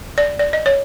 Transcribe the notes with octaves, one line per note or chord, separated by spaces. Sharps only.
D5
D5
D#5
C#5